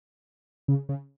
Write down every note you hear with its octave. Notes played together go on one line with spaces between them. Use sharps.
C#3
C#3